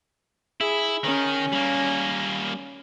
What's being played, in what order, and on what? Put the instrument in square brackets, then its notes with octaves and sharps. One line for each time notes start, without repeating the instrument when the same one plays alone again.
[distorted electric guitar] E4 [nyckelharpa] G#4
[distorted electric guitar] D#3 [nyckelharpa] C#4
[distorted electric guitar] G3 A#3